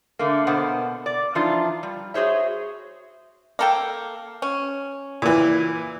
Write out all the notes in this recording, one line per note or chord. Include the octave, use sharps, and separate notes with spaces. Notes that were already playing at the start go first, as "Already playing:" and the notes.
D3 A3 A#3
B2 B3 A#4 C5 F#5
D5
E3 F3 D4 D#4 F4
G3
F#4 G#4 C5 C#5 E5
A#3 A4 G5
C#4
A#2 E3